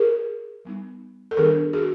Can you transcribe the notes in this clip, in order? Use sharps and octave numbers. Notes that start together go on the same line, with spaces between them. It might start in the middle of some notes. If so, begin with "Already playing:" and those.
Already playing: G#4 A#4
G3 B3 D#4
A4
D#3 G3 B3 D4 G#4 A#4
F#4 G#4